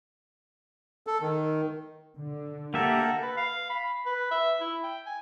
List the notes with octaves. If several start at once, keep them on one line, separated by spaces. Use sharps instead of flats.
A4
D#3
D3
A#3 G4 A4 A#4 E5 F#5
B4
F5
B5
B4
E5
E4
G5
G#5